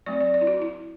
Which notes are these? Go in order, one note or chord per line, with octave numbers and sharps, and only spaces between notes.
F#3 A3 C4 D5
D5
D5
E4
F#4
E4